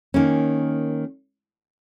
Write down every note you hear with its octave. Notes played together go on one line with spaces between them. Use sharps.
D#3 A#3 C#4